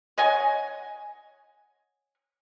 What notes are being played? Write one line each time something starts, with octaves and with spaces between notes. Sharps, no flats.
C#5 D#5 F#5 G#5